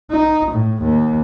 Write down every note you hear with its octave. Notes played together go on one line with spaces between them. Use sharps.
D#4
A2
D#2